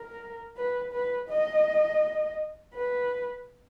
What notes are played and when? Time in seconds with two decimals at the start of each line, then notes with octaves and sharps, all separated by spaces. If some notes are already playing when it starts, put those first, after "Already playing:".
Already playing: A#4
0.57 B4
0.93 B4
1.29 D#5
2.74 B4